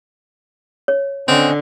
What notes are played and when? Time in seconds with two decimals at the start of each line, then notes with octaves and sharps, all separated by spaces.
0.88 C#5
1.28 D3 C4 C#4 D#5 F#5